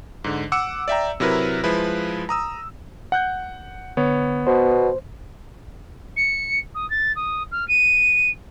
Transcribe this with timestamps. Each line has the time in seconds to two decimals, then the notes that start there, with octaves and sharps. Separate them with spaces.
0.24 G#2 D3
0.52 F#5 D6 E6 C#7
0.88 D5 E5 G5 A#5
1.20 C3 F#3 E4 A#4 B4
1.64 F3 G#3 E4 B4
2.29 A#5 D#6 E6
3.12 F#5 F#6 G6
3.97 D3 B3 C#5
4.47 B2 C5
6.16 C#7
6.74 D#6
6.90 A6
7.15 D#6
7.51 F6
7.68 D#7